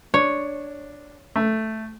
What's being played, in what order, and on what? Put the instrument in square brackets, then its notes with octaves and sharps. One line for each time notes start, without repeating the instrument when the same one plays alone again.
[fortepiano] D4 [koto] C#5
[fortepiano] A3